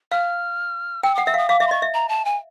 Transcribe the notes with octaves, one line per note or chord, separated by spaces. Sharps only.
F5 F6
G5 E6
F#5 D#6
E5 E6
F5
D#6
F5 D6
E5 D6
C6
D#5 C#6
E5
A#5
A5
G#5